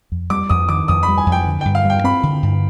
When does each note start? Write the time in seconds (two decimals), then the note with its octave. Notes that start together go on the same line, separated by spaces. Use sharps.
0.12 F2
0.30 G3 D6
0.49 F2 D#6
0.69 D#3 D6
0.88 F2 D#6
1.03 B5
1.08 G3
1.18 G#5
1.26 F2
1.32 G5
1.46 D3
1.61 G2 G5
1.75 F5
1.85 G3 G5
2.04 C4 B5
2.23 D3
2.43 G2